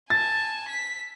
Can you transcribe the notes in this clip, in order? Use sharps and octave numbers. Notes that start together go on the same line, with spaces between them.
G#5 A5 A6
B6